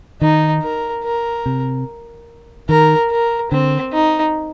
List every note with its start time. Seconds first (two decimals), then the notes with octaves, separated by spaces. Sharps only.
0.21 D#3 D#4
0.63 A#4
1.04 A#4
1.46 C3
2.69 D#3 A#4
3.11 A#4
3.51 D3 C4
3.93 D#4